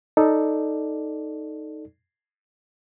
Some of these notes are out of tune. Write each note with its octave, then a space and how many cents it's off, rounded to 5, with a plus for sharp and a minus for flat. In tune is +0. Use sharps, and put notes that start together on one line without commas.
D#4 +0 A4 +0 D5 +5